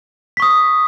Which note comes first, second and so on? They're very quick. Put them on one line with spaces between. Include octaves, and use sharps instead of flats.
B6 C#6 D#6